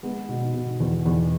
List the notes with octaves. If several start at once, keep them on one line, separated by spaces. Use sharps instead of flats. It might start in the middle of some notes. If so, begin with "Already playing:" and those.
G#3 B3
B2
B2
E2
E2